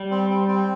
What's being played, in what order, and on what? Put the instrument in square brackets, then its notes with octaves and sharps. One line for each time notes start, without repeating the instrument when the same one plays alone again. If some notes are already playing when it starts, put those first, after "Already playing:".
Already playing: [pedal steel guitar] G3
[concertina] C4
C4
C4